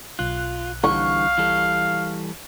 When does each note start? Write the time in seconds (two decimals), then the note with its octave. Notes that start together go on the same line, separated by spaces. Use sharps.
0.19 B1 F4 F#6
0.84 D3 E3 G3 F5 C#6
1.38 E3 G3 A4